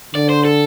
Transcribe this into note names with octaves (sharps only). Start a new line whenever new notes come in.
D3 D5
C5
A4